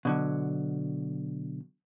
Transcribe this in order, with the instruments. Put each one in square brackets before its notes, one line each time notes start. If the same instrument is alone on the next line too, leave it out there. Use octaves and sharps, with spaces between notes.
[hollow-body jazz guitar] B2 D3 F#3